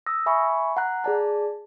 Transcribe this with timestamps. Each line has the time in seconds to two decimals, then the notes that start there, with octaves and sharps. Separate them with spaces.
0.06 D#6 E6 A#6
0.26 E5 G#5 B5 C#6
0.76 F#5 A#5 F#6
1.04 G#4 D5 A5